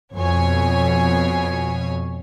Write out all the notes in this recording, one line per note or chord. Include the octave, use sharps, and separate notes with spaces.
F2 B2 C#5 G#5